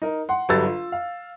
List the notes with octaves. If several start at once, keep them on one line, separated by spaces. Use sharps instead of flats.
D#4 A#4
F#5 C6
G1 F#3 G3 A4 E6 A6
F4
F5